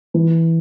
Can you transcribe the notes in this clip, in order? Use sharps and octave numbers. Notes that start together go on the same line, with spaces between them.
E3